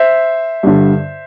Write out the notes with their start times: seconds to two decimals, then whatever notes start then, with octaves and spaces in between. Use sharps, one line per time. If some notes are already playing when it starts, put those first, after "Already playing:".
Already playing: C5 E5
0.63 G2 D3